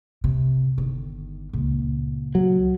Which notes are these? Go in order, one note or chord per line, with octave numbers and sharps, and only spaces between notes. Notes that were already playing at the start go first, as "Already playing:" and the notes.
C3
G1 D#3
C#2 A#2
F#3